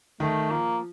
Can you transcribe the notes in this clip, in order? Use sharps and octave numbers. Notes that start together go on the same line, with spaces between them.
D#3 A3
F3 A#3